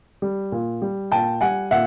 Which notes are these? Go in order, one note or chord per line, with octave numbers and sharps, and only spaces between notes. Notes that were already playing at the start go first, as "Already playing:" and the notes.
G3
A#2
G3
A#2 G5 A5
G3 F#5 G#5
A#2 E5 F#5